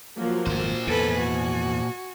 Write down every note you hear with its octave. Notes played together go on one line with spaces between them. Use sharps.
F3 F#3 A#3
G#1 F2 A#2 C5
E2 G#2 E3 A4 B4 G#5
F#4